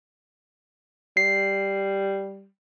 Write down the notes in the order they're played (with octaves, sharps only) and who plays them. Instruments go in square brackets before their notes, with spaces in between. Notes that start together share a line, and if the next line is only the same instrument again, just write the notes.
[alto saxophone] G3 [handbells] C7